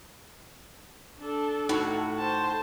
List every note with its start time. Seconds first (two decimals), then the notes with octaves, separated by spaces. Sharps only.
1.20 D4 A4
1.69 A2 D#4 F#4
2.18 C5 A5